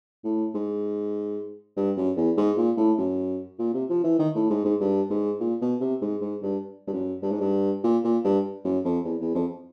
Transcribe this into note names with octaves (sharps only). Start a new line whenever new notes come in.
A2
G#2
G2
F#2
E2
G#2
A#2
A2
F#2
A#2
C3
F3
E3
D#3
A2
G#2
G#2
G2
G#2
A#2
B2
C3
G#2
G#2
G2
G2
F#2
G2
G#2
G2
A#2
A#2
G2
F#2
F2
E2
E2
F2